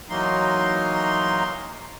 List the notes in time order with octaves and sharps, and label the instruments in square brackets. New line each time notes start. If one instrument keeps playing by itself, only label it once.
[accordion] E3 F#3 A#3 D#4 C6